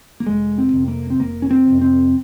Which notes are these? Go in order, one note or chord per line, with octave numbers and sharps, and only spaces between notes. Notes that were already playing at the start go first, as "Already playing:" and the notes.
A#3
F1 G#3
C4
F2 C3
A#3
C4
F1 A#3
C#4
C4
F2 C3
C4